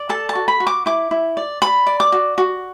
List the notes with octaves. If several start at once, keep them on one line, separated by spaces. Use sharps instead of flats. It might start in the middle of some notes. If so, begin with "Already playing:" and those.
Already playing: D5
A4 A5
A5
F#4
B5
F#4
D6
E4 D6
E4
D5
D5 B5
D5
D6
F#4
F#4